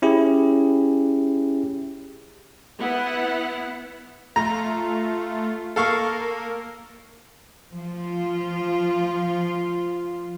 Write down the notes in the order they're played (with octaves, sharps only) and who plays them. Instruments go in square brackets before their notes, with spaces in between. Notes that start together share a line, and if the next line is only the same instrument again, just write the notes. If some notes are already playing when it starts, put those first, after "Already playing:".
[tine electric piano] C#4 E4 G4 G#4
[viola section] B3 E4 F#5
[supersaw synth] A3 F4 [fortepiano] A#5
[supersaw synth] A#3 A#4 [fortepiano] A4 F5 C#6
[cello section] F3 F4